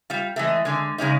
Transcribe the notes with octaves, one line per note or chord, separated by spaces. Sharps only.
G3 F4
E3 G#3 A3
D3 G#3
C#3 G#3 C#4 D#4